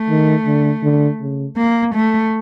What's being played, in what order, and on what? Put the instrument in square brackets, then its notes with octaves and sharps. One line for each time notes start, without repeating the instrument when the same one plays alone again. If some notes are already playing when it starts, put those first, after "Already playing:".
Already playing: [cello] A3
[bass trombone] D#3
D3
D3
C#3
[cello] A#3
A3